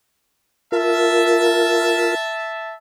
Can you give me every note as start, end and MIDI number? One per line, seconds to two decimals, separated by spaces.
0.72 2.15 65
0.72 2.15 70
0.72 2.73 76
0.72 2.73 81